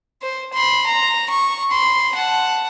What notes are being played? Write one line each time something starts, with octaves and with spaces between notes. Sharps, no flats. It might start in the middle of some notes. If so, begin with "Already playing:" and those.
C5
B5 C6
A#5
C#6
B5 C6
F#5 A5